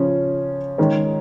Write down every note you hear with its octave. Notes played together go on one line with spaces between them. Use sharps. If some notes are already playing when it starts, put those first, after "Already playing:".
Already playing: C#3 F3 C#4
D#3 G#3 C#4